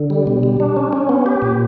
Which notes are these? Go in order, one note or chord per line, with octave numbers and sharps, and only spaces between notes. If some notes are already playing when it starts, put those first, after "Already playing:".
Already playing: D3
G3
B2
G3
D4
C#4
C#4
B3
G4
A#2